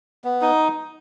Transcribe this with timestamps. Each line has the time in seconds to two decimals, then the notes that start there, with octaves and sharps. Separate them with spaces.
0.24 B3
0.42 D#4